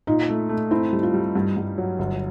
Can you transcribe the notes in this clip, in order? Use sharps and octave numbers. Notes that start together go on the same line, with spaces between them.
A#2 D#4
A3
A3
C4 E4
G3
F4
G3
G2
G2
F#3
G1